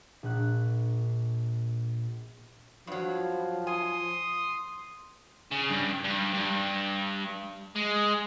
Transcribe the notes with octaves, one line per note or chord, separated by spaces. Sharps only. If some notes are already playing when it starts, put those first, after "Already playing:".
A#1 F#6
G2 F3 F#3
G#5 C6 D#6
C#3
G2
G2
G2
G#3